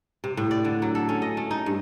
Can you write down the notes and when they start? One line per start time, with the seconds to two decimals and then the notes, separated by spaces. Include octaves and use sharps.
0.24 C3
0.37 A2
0.51 D5
0.65 D3
0.82 F#3
0.95 A4
1.09 C#4
1.22 D#5
1.37 A3
1.51 D#4
1.66 G2